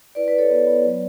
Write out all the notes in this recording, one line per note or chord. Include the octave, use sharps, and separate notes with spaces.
E4 B4 D5
B4 D5
E4
A4 C#5
B3
B3
F#3